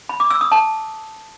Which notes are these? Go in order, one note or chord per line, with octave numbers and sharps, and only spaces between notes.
B5
D6
E6
D#6
A5